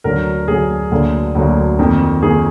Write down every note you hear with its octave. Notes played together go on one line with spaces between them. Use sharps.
D2 D3 F#3 A#4
D2 D3 F#3 G#4
D2 D3 F#3 A#3
D2 D3 F#3 A#3
F2 D#3 A#3
F2 D#3 A#3 G#4